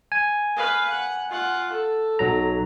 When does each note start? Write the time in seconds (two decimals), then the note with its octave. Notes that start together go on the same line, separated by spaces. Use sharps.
0.12 G#5
0.56 B4 F5
0.90 F#5
1.29 F4 F#5
1.72 A4
2.19 B1 F#3 A#5